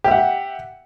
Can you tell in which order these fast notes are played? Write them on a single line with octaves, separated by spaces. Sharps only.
G4 E5 F#5